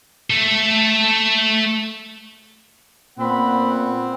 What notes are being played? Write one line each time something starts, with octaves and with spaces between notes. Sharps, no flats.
A3 A4
A#2 B3 C4 F#5 B5